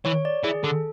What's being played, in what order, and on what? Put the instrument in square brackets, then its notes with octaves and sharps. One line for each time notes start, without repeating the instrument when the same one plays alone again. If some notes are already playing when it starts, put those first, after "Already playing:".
[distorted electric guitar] E3 [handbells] C#5
[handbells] D5
[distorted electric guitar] E3 [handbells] G#4
[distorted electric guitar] D3 [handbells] A4